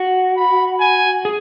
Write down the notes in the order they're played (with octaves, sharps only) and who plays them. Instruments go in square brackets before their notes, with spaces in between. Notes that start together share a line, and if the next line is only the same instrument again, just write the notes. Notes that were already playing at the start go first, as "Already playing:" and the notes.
Already playing: [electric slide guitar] F#4
[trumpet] B5
G#5
[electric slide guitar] G#4